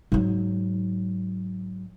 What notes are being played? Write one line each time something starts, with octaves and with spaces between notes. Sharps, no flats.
G#2 F#3